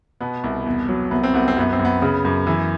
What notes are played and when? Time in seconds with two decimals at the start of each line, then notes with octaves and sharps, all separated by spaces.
0.21 B2 B3
0.44 C2
0.66 E2
0.88 F#3
1.11 C2 B3
1.23 C4
1.34 C2 B3
1.48 C4
1.57 F#2 B3
1.73 C4
1.79 F#2
1.85 B3
2.02 C#3 B3
2.25 F#2
2.47 E3